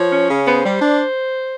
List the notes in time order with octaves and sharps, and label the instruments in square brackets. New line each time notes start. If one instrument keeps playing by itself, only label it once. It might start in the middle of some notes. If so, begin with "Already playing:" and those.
Already playing: [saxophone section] F3 C#5
C#4
C#3
B3 C5
G3
D4